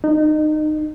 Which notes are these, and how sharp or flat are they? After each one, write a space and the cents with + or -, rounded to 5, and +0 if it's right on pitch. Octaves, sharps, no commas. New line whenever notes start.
D#4 -25